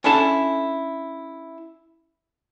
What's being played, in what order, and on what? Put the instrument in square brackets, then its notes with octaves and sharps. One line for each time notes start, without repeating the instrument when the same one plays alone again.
[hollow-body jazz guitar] C#4 D4 E4 A4 A5